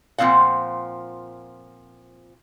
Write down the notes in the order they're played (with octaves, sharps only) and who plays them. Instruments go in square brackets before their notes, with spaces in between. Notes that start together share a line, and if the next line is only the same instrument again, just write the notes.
[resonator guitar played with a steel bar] A#2 F3 C4 F5 F#5